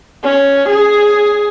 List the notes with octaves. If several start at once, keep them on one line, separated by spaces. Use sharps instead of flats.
C#4
G#4